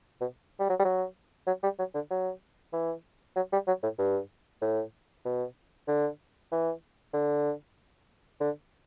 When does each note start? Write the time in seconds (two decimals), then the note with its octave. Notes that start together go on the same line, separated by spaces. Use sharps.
0.21 B2
0.60 G3
0.69 F#3
0.79 G3
0.85 F#3
1.47 F#3
1.63 G3
1.79 F#3
1.95 D3
2.11 F#3
2.73 E3
3.36 F#3
3.53 G3
3.67 F#3
3.83 A2
3.99 G2
4.62 A2
5.25 B2
5.88 D3
6.52 E3
7.14 D3
8.41 D3